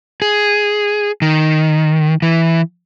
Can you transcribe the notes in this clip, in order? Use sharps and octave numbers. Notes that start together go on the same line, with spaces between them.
G#4
D#3
E3